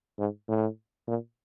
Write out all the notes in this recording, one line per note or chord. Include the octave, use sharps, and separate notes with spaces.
G#2
A2
A#2